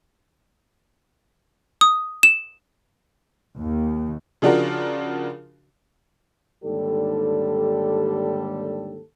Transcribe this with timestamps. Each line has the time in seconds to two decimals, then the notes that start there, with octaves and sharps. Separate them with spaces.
1.81 D#6
2.23 E7
3.58 D#2
4.42 C#3 F3 D4 F4 F#4 A#4
6.63 D#2 G#2 D3 G3 G4 A4